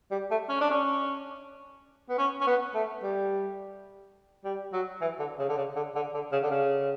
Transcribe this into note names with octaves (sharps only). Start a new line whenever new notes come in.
G3
A3
C#4
D4
C#4
B3
C#4
C#4
B3
A3
G3
G3
F#3
E3
D3
C#3
D3
C#3
D3
D3
D3
C#3
D3
C#3